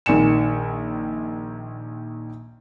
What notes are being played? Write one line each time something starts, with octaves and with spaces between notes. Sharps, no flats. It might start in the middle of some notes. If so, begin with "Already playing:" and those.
A#1 D#3 G#5 C#7 E7